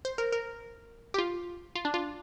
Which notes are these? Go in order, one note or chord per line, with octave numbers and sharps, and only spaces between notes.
C5
A#4
A#4
G4
F4
F4
D4
F4